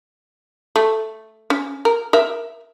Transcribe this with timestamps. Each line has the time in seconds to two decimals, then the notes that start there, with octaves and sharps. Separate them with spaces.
0.76 A3
1.50 C#4
1.85 A#4
2.13 A#4 E5